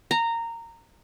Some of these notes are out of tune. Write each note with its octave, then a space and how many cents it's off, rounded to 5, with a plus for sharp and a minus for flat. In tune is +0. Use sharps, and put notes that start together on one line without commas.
A#5 -15